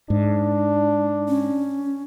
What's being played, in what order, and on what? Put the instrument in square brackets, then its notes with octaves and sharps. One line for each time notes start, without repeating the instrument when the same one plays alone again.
[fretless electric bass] G#2 [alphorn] D4
[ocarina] C#4